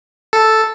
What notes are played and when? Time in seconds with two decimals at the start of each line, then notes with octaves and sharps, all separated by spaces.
0.33 A4